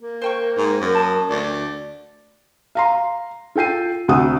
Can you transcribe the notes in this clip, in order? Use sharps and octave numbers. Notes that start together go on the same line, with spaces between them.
A#3
A#4 C5 G5 C#6
G#2
F#2
A5 D6 D#6
D2 D5
F5 A#5 C6
F4 A4 G5 C7 D#7
D2 C3 F#4 F#5 D#6 E6